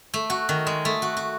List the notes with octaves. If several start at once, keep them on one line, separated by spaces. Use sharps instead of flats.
A3
F#4
D#3
G#3
A3
F#4
F#4